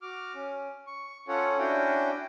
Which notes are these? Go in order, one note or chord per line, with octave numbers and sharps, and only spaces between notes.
F#4 D6 F6
C#4
C#6
C#4 F4 A4 C#5 F#5
C#4 D4 E4 F#4 G5